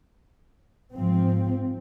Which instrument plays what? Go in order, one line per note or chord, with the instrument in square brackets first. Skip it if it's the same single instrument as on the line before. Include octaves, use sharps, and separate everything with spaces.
[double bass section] G#2 F3 C4